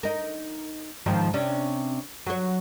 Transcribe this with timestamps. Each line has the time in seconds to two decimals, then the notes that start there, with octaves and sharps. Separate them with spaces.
0.03 D#4 A#4
1.06 G#2 D#3 F3
1.34 C3 C#4 D4
2.26 F#3 C#5